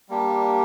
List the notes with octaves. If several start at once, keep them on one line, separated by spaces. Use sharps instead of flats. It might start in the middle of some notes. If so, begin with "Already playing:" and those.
G3 A#3 D4 G4